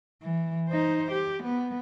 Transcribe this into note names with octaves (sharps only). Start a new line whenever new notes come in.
E3
D#4 C5
G4
B3